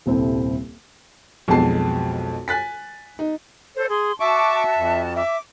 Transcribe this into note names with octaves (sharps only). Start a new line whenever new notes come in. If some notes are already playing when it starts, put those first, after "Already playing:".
D#1 C2 C4 E4 A4
B1 F2 B2 G#3 A5 C7
G#5 F#6 A6 B6
D#4
A4 C5 C#5
G#4 C6
F#4 E5 A5 C#6 D6
F2
E5 D6